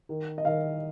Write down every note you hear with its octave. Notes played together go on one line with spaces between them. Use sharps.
D#3
D#5
D#3 F5